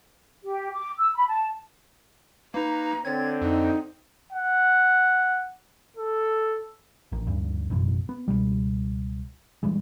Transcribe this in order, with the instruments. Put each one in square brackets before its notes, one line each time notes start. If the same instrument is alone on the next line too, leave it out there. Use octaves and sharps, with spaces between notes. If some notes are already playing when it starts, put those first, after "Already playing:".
[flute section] G4
D6
E6
B5
A5
[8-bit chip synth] A#3 D#4 [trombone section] B4 [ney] A#5
[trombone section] D3 C4 [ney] C#5 [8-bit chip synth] G#6 A6
[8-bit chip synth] F2 [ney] D#4
[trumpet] F#5
A4
[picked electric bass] A1 A#2
D2 G2 A#2
A1 F#2 B2
B3
C#2 G#2 B2 G3
A#2 E3 G3 G#3